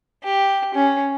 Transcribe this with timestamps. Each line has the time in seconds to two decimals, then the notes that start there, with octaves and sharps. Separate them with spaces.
0.24 G4
0.75 C#4